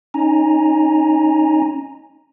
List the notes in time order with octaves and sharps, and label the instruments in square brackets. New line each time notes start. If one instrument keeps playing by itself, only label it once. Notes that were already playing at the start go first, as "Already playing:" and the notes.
[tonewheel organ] C#4 D#4 G#5 A#5